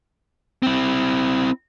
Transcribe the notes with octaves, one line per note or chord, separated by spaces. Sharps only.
C4 E4